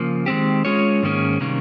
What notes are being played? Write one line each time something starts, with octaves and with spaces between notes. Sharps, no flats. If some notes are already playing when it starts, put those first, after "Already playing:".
Already playing: C#3 F3 A#3
D#3 G#3 C4 G4
G#3 C#4 F4 G#4 C#5
G#2 D#3 A#3 C#4 G#4
C3 D#3 G3 A#3 C#4